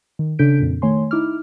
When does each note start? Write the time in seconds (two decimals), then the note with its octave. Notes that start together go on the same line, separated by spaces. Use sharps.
0.19 D#3
0.39 C#3 D4 A4 G6 B6 D7
0.60 F2 A#2
0.82 D#3 A3 C#5 G#5 C6
1.11 D#4 E4 D6 F6